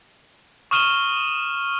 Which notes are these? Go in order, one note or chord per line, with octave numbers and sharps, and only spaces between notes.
C#6 D#6 F6 D#7 E7 G7